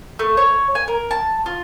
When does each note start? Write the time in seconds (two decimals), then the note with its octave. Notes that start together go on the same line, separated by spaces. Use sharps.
0.19 A3
0.37 C#5
0.75 G#5
0.88 A#4
1.11 A5
1.46 F4